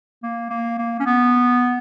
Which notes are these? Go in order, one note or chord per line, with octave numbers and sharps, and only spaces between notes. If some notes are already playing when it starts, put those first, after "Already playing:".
A#3
A#3
A#3
C#4
B3